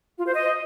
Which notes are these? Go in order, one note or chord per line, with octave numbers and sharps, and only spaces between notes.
F4
C5
D#5